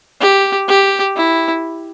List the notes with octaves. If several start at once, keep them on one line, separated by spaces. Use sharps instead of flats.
G4
G4
E4